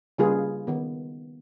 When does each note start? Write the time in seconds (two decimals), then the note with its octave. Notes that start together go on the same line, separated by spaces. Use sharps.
0.18 C#3 G3 A#3 F4 G#4 B4
0.67 D#3 B3